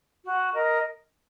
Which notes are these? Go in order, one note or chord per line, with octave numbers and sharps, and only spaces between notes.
F#4
A#4 D#5